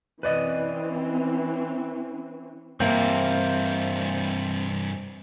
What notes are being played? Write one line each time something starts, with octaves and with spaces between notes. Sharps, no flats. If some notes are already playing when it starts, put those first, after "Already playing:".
E3 C4 C#4 B4 D5 D#5
G2 C3 E3 A#3 C4